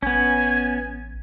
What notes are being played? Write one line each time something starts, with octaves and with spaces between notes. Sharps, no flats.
A1 B3 C#4 G#5